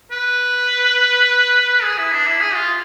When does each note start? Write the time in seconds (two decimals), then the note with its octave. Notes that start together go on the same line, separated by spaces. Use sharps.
0.11 B4
1.83 G#4
1.98 E4
2.12 D4
2.27 E4
2.41 G#4
2.55 F4